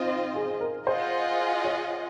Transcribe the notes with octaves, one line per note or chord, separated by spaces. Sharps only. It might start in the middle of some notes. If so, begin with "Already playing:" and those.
Already playing: C4 D#4 F4 C5 D#5
G#4
A#4
F4 G#4 C5 D#5 F#5
C#5